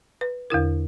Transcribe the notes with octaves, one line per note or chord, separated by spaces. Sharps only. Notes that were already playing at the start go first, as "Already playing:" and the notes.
B4
E2 D3 E4 A#4